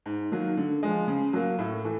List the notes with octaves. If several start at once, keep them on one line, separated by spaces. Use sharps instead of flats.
G#2
D#3 F#3 A#3
D3
F3 G#3
C#3
F#3 A#3
A2
E3 A3